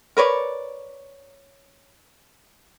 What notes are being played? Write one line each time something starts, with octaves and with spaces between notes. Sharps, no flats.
A#4 B4 C#5 D5